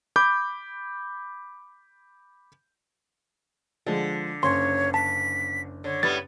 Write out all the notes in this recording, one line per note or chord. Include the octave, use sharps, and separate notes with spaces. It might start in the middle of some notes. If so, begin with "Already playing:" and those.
B5 D6 G6
D3 F3 G#3
F#1 C#4 C#5 C6
A5 B6
D3 C#5
A2 G3 B3 A6